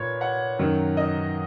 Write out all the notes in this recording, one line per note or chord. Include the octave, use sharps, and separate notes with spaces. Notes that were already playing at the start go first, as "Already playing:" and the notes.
Already playing: A#2 B4 C#5
F#5
F#2 D#3 F#3
D#5